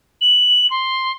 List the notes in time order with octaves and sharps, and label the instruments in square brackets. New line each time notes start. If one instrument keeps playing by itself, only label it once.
[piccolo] F#7
C6